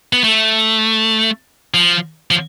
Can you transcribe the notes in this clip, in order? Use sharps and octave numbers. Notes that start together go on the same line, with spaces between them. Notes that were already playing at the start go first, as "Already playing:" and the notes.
B3
A3
F3
F3